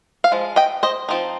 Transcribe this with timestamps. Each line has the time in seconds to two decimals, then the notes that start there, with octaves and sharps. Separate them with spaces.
0.24 F5
0.32 F3 G#3
0.56 D#5 G5
0.83 C5 D#5
1.09 F3 C4 D#4